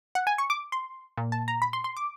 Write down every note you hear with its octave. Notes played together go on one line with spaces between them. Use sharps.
F#5
G#5
C#6
D6
C6
A#2
A5
A#5
B5
C6
C6
D6